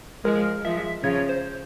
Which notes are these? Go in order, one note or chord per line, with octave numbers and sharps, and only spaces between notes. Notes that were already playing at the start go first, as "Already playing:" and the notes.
F3 G#3 A#4
F3 G#3 E5
C#3 F3 C#5
C5